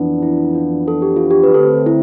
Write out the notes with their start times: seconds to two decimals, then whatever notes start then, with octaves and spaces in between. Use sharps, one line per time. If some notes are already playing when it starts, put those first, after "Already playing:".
Already playing: F2 E3 B3 D4
0.22 E4
0.55 F4
0.88 A4
1.02 G4
1.17 F4
1.31 G4
1.43 B4
1.54 D3 A3 C4 A4
1.86 E4